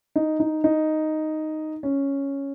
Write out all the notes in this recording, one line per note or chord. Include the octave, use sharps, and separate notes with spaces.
D#4
D#4
D#4
C#4